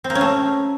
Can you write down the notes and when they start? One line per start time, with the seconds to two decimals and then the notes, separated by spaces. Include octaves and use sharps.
0.04 C4
0.10 A#3
0.15 C#4
0.21 A3